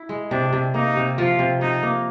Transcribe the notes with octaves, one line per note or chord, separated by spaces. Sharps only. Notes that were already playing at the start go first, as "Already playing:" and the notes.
Already playing: E4
G#3
C3 D4
C3
A#3 D#4
C3
F3 F4
C3
C3 D#4
A#3